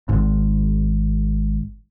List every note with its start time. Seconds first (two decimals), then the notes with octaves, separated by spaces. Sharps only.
0.09 G#1 G#2